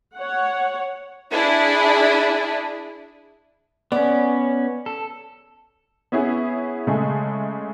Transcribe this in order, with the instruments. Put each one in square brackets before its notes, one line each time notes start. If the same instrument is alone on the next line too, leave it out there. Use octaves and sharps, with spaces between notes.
[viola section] C#5 F#5
[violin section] D4 E4 G#4
[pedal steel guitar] B3 C#4 [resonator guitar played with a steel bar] D5
[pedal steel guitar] A4
[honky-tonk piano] B3 C#4 E4 G#4
C#3 G#3 A3